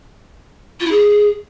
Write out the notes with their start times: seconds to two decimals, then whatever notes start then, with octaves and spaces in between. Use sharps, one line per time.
0.79 F4
0.85 E4
0.91 G#4